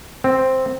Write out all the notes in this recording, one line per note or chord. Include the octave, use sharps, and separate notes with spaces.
C4